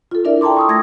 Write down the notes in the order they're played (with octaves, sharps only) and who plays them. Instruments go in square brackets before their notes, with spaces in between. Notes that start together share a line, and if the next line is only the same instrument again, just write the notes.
[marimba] F4 A4
D4 E4 A#4 D5 E5
G5 A5 A#5 C6 D6
C#6 D#6 E6
A3 G#6 A#6